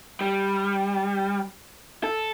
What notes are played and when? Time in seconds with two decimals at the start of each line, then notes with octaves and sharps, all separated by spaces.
0.21 G3
2.04 A4